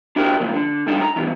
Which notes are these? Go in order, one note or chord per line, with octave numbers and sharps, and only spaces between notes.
D4 E4 F#4 G4 A#4 C5
C2 F3 A#3
D3
A2 G3 D4 D#4 A4
A#5
G2 B2 D#3 E3